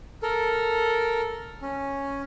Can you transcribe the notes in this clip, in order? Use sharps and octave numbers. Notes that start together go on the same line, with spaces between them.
A4 A#4
C#4